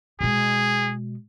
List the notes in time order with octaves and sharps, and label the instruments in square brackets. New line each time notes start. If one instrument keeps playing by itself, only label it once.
[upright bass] B2 G#3 [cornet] G#4